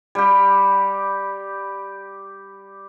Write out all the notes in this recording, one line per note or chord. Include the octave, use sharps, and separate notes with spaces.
G3 G4